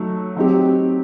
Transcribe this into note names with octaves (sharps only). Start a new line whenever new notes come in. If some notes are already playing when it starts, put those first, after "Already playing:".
Already playing: F#3 A3 D#4
F#3 C4 D#4 G4